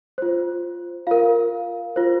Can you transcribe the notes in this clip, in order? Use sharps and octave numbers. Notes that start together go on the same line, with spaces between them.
F4 C5
F4 A#4 F5
F4 C5